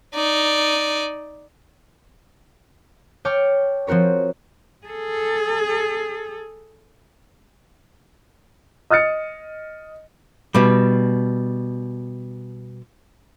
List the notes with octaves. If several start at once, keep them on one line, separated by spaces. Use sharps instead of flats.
D#4 D5
C#5 G5 A5 C#6 D6 F6
F3 C4 F#4 A#4 C#5
G#4 A4
D#5 D#6 F6 A6 C#7
B2 G3